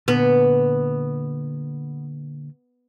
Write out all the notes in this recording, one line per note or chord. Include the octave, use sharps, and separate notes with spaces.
A#2 D3 B3